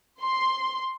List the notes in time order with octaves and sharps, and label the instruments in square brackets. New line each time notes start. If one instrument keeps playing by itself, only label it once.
[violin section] C6